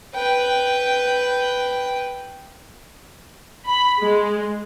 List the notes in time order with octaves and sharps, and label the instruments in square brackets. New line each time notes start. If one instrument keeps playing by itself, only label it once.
[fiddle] B4 G5
[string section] B5
G#3